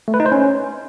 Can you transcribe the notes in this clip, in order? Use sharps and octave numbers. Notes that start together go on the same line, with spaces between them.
A3
B4
D#4
C5
C#4